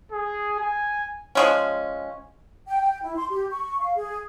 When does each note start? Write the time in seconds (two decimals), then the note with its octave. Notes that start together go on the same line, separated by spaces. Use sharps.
0.12 G#4
0.60 G#5
1.35 F3 G#3 C#4
2.67 G5
2.82 G5
3.03 E4
3.16 C6
3.30 G4
3.51 C#6
3.81 F5
3.96 G#4